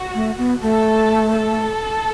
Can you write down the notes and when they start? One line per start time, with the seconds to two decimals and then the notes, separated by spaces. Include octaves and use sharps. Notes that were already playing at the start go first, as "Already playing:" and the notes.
Already playing: F#4
0.14 A3
0.38 B3
0.62 A3 A4
1.34 A4